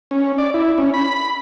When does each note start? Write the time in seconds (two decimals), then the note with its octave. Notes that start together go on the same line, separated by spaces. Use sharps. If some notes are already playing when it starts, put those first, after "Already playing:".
0.11 C#4
0.38 D5
0.54 E4
0.78 C#4
0.94 B5